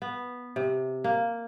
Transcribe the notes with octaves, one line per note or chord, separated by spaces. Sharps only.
B3
C3
A#3